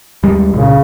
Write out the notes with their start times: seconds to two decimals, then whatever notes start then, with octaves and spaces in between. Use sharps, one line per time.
0.23 D#2 G3 G#3
0.53 C2 A#2 C#3